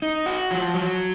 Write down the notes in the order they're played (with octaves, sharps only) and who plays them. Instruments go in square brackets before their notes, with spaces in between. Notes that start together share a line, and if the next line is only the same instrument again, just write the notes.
[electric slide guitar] D#4
F#4
F3
F#3